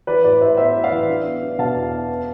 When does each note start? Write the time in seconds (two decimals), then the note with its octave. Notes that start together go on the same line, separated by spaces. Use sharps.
0.07 E3 B4 D5
0.24 A2 B4 D5
0.41 A2 C5 E5
0.57 B3 C5 E5
0.75 A2
0.83 D5 F5
0.91 E3
1.08 D4
1.25 B3
1.42 D4
1.59 B2 F5 A5
1.75 E2
1.93 B3
2.09 B3